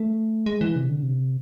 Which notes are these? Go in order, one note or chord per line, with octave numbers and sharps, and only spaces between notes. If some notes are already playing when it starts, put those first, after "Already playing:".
Already playing: A3
G#3
E3
C3
D3
C3